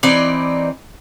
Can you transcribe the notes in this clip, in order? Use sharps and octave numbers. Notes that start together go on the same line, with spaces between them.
E3 C4 D#4 D5